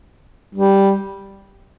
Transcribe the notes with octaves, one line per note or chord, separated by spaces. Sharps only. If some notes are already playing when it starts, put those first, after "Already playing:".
G3